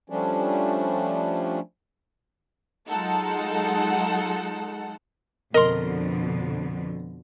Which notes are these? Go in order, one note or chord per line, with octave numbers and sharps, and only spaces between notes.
F3 G3 A3 C#4 D4
F#3 G#3 D#4 F4 A4 F#5
F2 B2 D3 A#4 D#5 C6